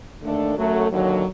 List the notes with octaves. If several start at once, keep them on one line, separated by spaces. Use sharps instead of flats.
D#2 D3 A3 D4 A4
F#2 F#3 A3
D#2 D3 F#3